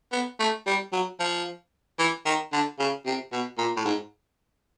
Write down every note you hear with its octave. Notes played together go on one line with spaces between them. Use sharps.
B3
A3
G3
F#3
F3
E3
D#3
D3
C#3
C3
B2
A#2
A2
G#2